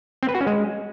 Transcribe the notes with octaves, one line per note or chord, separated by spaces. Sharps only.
C4
B4
F#4
C#4
G#3